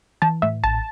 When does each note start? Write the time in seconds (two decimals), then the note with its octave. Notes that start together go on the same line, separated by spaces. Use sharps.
0.22 E3 A5
0.42 A2 E5
0.64 A1 A5